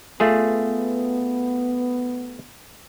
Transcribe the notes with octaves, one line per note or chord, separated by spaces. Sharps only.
A3 B3 F4 G#4